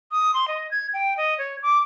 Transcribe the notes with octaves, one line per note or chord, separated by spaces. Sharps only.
D#6
C6
D#5
G#6
G5
D#5
C#5
D6